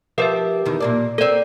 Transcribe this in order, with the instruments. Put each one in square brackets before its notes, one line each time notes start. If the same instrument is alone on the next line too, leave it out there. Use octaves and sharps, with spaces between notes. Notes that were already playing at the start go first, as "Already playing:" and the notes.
[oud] F3 G4 F5 [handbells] A#4 B4 E5
[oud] E2 D#3
A#2 A#3 D5
[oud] A#3 C4 [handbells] A4 D5